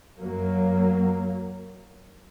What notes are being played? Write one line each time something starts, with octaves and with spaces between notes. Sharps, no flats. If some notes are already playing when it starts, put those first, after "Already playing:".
F#2 F#3 A#3